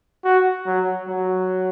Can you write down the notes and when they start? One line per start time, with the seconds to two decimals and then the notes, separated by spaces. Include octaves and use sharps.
0.25 F#4
0.67 F#3
1.08 F#3